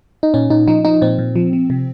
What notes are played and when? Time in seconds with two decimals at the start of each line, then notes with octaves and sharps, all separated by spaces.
0.23 D#4
0.34 A#2 C#4
0.50 A#2 D#4
0.68 F3 D#4
0.85 F3 D#4
1.02 A#2 C4
1.19 A#2
1.36 F3
1.53 F3
1.70 C3